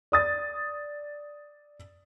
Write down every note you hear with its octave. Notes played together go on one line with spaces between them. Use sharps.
D5 D#6 A6